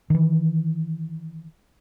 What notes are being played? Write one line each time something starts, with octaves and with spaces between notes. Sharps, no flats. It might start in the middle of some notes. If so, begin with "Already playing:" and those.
D#3 E3